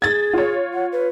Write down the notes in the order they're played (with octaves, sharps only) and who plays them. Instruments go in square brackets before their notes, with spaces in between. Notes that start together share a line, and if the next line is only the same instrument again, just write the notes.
[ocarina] G#4 [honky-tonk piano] G#6 A6
[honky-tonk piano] F4 C#5
[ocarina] F#5
B4